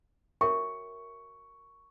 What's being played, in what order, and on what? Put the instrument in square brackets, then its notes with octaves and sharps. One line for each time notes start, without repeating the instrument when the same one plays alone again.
[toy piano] F#4 A#4 C#5 E5 G5 [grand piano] C#6